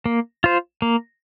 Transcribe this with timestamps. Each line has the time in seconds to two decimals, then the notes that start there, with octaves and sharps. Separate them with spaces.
0.06 A#3
0.44 F4 C5
0.82 A#3